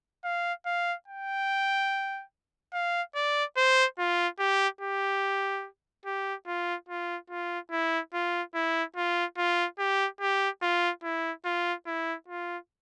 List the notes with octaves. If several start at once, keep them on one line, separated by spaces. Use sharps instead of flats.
F5
F5
G5
F5
D5
C5
F4
G4
G4
G4
F4
F4
F4
E4
F4
E4
F4
F4
G4
G4
F4
E4
F4
E4
F4